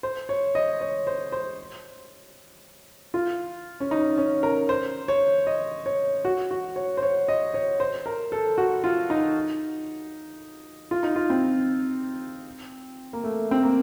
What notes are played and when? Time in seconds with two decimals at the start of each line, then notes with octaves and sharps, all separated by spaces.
0.03 C5
0.29 C#5
0.55 D#5
0.81 C#5
1.07 C5
1.32 C5
3.14 F4
3.80 C#4
3.91 D#4
4.18 C#4
4.43 A#4
4.69 C5
5.08 C#5
5.47 D#5
5.86 C#5
6.25 F#4
6.51 F#4
6.76 C#5
6.97 C5
7.03 C#5
7.28 D#5
7.54 C#5
7.80 C5
8.06 A#4
8.32 A4
8.58 F#4
8.84 F4
9.10 D#4
10.91 F4
11.03 D#4
11.16 F4
11.30 C4
13.13 A#3
13.24 A3
13.51 C4
13.63 A#3